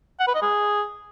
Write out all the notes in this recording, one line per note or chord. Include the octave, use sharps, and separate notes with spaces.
F#5
B4
D#5
G#4